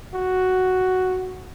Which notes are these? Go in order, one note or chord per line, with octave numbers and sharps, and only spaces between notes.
F#4